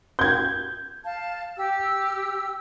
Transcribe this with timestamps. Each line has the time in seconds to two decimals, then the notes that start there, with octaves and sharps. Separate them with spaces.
0.19 G6 G#6
1.04 F5 A5
1.56 G4 E6